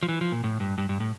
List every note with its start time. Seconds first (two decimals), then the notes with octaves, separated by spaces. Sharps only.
0.03 F3
0.08 E3
0.21 F3
0.32 A#2
0.44 A2
0.60 G2
0.78 G2
0.89 G2
1.00 A2